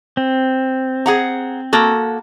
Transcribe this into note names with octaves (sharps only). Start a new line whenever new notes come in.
C4
G#4 F#5 A#5
A#3 F#4 A4